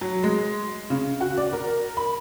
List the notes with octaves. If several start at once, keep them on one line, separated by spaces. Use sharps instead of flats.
F#3
G#3
C#3
F#4
D5
A#4
B5